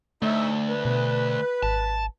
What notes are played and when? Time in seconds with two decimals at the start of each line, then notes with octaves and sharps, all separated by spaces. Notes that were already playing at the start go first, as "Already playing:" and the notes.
0.22 D2 A3 D#4 C#5 E5
0.68 B4
0.85 B2
1.63 G#1 A5